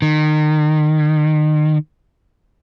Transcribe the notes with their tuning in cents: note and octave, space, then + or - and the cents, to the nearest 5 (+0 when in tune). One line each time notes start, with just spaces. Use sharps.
D#3 -30